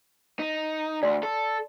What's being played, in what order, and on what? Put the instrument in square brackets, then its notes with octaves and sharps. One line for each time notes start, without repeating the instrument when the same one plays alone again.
[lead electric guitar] D#4
[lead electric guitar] D2 [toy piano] D5 C6
[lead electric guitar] A4